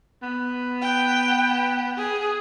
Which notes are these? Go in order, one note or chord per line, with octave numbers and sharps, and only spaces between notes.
B3
G5
G#4